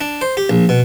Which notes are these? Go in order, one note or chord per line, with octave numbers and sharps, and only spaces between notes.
D4
C5
G4
A#1
B2